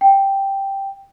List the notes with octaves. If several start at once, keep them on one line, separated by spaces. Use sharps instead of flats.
G5